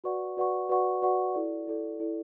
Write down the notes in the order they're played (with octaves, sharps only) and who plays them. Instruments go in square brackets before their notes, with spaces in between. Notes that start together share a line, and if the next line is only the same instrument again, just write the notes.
[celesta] F#4 B4 D5 F#5 C#6
F#4 B4 D5 F#5 C#6
F#4 B4 D5 F#5 C#6
F#4 B4 D5 F#5 C#6
E4 A4 D5
E4 A4 D5
E4 A4 D5